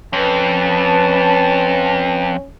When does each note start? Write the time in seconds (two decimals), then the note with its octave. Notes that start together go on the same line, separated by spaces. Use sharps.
0.13 F2 C#4 B4 A5